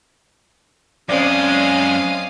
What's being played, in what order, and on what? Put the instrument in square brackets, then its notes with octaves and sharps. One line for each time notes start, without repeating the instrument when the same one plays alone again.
[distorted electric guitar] F#2 G#3 [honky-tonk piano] C4 D5 [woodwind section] C#4 [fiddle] F5 D#6